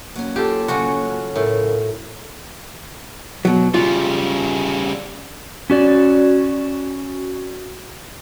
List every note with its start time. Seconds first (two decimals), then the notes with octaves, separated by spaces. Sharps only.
0.16 F#3 A#3 C#4
0.36 F4 G4 A4
0.68 C#3 F#3 C#4 F#4
1.36 A2 A#4
3.45 B2 F#3
3.74 C#3 G3 F4
5.70 C#4 F#4 D5